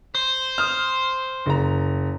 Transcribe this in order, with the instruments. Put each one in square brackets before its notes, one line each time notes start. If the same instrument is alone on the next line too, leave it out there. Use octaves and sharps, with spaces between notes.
[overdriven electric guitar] C5
[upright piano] D#6 F6
F#1 A#5